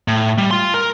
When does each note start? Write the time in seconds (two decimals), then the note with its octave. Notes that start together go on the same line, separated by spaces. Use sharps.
0.08 A2
0.38 G3
0.51 F4 C6
0.74 A#4